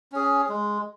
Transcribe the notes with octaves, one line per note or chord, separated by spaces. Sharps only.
C#4 G#4
G#3